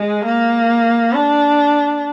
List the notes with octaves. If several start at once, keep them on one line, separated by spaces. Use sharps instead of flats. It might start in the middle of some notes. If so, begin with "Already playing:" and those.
Already playing: G#3
A#3
D4